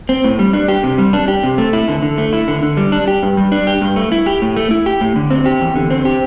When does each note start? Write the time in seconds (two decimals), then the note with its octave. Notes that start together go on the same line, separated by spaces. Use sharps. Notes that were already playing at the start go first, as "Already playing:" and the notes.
0.09 C4
0.24 A2
0.39 G3
0.53 D4
0.68 G4
0.83 C3
0.98 G3
1.13 D4
1.28 G4
1.43 C3
1.58 A3
1.73 E4
1.88 D3
2.02 D3
2.18 A3
2.33 E4
2.48 D3
2.63 D3
2.77 G3
2.92 D4
3.08 G4
3.23 G2
3.37 G3
3.52 D4
3.67 G4
3.81 G2
3.96 A3
4.12 E4
4.26 G4
4.42 A2
4.56 A3
4.71 E4
4.86 G4
5.01 A2
5.16 D3
5.31 C4
5.46 G4
5.61 E2
5.76 D3
5.90 C4
6.05 G4